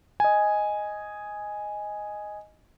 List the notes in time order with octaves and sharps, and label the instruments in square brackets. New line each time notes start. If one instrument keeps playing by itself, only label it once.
[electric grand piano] D#5 G#5